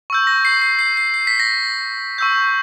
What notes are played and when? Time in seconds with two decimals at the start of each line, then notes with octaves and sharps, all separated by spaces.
0.10 C#6 E6 G6
0.27 A#6
0.45 C7
0.62 C7
0.79 C7
0.97 C7
1.14 C7
1.27 B6
1.39 A#6
2.18 C#6 E6 G6